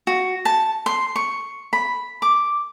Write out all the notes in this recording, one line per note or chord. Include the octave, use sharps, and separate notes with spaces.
F#4
A5
C6
C#6
B5
D6